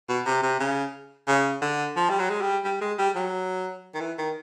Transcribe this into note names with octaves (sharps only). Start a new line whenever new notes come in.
B2
C3
C3
C#3
C#3
D3
F3
G3
F#3
G#3
G3
G3
G#3
G3
F#3
D#3
E3
D#3